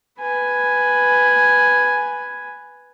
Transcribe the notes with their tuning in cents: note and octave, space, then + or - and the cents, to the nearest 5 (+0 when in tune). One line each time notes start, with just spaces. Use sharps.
B4 +0 G#5 +0